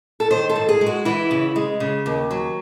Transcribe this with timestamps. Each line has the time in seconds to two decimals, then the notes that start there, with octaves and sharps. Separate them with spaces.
0.20 A4
0.31 D#3 C5
0.49 A4
0.56 G#2
0.69 G#4
0.81 G#3
0.86 F#4
1.05 E3 E4
1.31 C#3
1.56 G#3
1.80 C#3
2.06 D#2
2.31 F#3